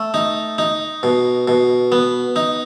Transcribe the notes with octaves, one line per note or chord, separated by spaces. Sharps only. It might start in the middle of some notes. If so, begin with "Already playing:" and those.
Already playing: A3
D#4
D#4
B2
B2
B3
D#4